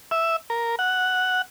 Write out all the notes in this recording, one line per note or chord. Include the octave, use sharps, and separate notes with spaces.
E5
A#4
F#5